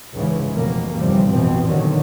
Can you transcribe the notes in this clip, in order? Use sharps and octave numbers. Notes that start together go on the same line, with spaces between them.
F1 C#2 G#2 C#3 E3
F1 B2 A#3
G1 D#2 C3 E3 F3 G3
A1 F2 B2 E3 C4
E2 A#2 D3 D#3 F#3